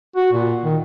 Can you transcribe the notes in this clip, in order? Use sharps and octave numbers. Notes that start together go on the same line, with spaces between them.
F#4
A#2
D#3